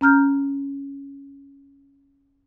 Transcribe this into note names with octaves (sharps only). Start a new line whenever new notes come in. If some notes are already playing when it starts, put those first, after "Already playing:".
C#4 A#5 F6 G6